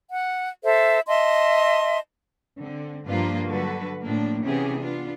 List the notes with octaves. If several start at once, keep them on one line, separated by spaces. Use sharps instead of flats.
F#5
A4 C5 E5
D#5 E5 A5 C6
D3 C4
G2 F3 A#3 D4 F4 B4
D3 F#3 G3 F#4 A4 B4
A2 F3 A#3 D4
C3 E3 B3 C#4 G4 G#4
B3 D4 F4